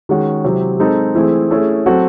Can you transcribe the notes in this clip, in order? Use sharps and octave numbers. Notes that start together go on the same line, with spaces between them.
D#3 G#3 C#4 F#4
C3 F#3 C4 E4
G#3 C4 D#4 A4
E3 A3 C4 E4 G#4
A3 C#4 E4 G#4
F#3 C4 F#4 A4